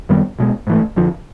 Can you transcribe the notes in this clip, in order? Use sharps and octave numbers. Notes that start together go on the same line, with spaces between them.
F#2 D#3 G3 B3
B1 B2 G#3
G#2 E3 A3
F2 D3 F3